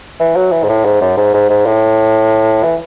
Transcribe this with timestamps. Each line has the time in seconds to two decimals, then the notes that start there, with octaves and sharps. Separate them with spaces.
0.20 E3
0.36 F#3
0.52 E3
0.64 G#2
0.69 A2
0.85 G#2
1.01 F#2
1.17 G#2
1.34 G#2
1.50 G#2
1.66 A2
2.63 E3